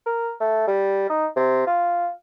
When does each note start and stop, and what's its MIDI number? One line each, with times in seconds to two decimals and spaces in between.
0.06 0.32 70
0.41 0.63 57
0.67 1.06 55
1.09 1.26 63
1.36 1.66 48
1.67 2.09 65